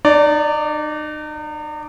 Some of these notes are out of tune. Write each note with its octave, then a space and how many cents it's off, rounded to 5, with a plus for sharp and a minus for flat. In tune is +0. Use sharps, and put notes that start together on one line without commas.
D#4 -40 D5 -10